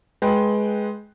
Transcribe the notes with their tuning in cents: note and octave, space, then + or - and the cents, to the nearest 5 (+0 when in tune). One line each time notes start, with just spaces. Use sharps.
G#3 +15 B4 +0 G5 +0